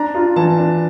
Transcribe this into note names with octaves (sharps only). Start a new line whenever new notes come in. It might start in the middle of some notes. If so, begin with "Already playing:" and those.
Already playing: D4 A#5
F4
E3 A5
D4